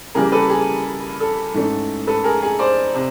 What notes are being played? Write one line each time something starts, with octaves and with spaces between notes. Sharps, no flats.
C#3 E3 G3 A#3 G#4 A#4
A4 B4
G#4
A4
G#2 E3 A3 C#4
A4 B4
G#4 A#4
G#4
C5 D5
C3